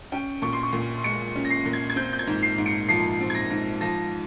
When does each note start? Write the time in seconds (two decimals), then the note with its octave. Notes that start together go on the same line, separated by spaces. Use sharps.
0.12 C#4 G5
0.42 A#2 C#6
0.53 C6
0.63 C#6
0.73 A#2
1.04 G#3 C#7
1.36 C#4
1.45 A#6
1.50 C7
1.66 A#2
1.73 G#6
1.90 G#6
1.96 C4 G6
2.13 G6
2.19 G#6
2.27 G#2
2.43 C7
2.58 G#2
2.66 C#7
2.89 F3 C7
3.21 C4
3.30 G#6
3.35 A#6
3.50 G#2
3.81 F3 A#6